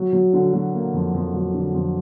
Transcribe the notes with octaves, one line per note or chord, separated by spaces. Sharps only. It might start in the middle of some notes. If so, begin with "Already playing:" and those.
Already playing: F#3
F#3
D3
F#3
A#3
F2
F2
F#3
D3
F2